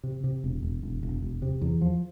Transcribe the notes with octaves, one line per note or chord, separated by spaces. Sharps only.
C3
C3
E1
E1
E1
E1
E1
C3
E2
F3